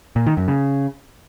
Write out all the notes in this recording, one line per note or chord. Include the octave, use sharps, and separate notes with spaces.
A#2
D#3
F#2
C#3